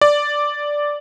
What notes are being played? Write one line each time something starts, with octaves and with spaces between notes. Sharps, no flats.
D5